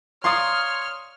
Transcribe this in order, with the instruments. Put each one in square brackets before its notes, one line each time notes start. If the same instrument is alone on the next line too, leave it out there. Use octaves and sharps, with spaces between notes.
[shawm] C#5 [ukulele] D5 F5 A#5 [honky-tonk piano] C6 D#6 [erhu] F6